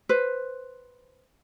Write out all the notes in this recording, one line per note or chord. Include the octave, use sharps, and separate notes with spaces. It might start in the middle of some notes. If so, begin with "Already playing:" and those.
B4 C5